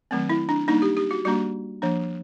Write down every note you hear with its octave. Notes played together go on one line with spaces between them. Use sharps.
D#3 F#3 A3 C4
E4
D4
G3 A#3 D4 D#4
G4
G4
F#4
G3 A#3 D4 F#4
F3 A#3 D4